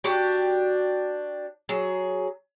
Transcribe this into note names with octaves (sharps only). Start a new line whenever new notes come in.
D4 F#4 G4
F#3 G#4